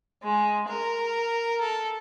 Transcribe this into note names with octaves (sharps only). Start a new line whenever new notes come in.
G#3
A#4
A4